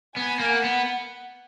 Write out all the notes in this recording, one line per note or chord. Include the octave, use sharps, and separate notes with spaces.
B3 G#5
A#3
F#5
B3